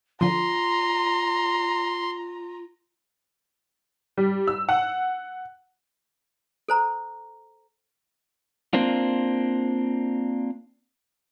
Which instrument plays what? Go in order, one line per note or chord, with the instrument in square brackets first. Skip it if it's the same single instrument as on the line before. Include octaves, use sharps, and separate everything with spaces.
[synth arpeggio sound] D3 F3 [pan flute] F4 [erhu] A#5 [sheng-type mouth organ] C6
[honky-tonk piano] G3
E6
F#5
[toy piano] A4 C5 A#5
[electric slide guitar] A#3 C4 D4 F4